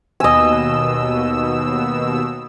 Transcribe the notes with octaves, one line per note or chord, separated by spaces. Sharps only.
D#2 B2 D#5 G#5 E6